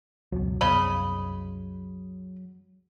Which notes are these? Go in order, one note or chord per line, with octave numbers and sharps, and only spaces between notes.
C#2 F#2 B2 F#3
C2 F#2 C#3 B3 D#5 B5